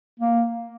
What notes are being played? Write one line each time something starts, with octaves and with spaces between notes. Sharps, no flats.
A#3